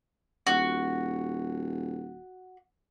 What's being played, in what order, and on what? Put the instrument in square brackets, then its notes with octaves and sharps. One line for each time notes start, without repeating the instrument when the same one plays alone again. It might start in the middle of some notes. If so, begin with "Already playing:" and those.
[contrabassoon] D#1 [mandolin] F#4